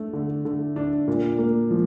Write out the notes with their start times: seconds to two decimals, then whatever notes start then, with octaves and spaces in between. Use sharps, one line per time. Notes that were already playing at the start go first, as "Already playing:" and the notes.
Already playing: A3 D4
0.13 D3
0.45 D3
0.76 D4
1.08 A#2
1.38 A#3
1.71 F3